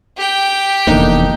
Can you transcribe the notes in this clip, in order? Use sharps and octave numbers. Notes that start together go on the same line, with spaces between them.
G4 G5
F1 E2 D3 A#3 D4 D#4